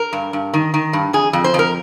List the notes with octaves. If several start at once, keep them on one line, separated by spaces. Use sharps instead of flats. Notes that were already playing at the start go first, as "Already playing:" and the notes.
Already playing: A#4
G2
G2
D#3
D#3
G2
F2 G#4
F2
C5
F2 A#4